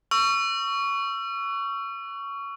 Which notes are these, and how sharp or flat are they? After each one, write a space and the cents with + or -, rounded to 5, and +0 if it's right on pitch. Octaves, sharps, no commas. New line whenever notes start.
C#6 +15 E6 +40